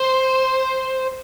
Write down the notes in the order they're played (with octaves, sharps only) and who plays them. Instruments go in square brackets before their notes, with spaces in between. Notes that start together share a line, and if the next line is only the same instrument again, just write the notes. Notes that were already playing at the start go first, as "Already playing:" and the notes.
Already playing: [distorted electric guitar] C5